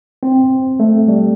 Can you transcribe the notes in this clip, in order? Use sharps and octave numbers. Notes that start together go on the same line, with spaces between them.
C4
A3
G3